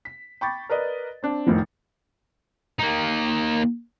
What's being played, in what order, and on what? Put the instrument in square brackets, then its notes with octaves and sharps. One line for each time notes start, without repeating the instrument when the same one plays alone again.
[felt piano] B6
G5 B5 C#6 D6 A6
A#4 B4 D5 D#5
C4 D4
F1 A2 D#3 F3
[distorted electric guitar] A#3 D#4